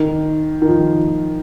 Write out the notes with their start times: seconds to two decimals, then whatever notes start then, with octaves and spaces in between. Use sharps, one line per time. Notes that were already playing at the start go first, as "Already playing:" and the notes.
Already playing: D#3
0.62 D#3
0.68 F3